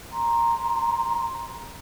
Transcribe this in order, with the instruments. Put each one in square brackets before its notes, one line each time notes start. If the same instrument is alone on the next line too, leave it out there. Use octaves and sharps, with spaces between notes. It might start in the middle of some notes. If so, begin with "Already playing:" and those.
[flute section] A#5 C6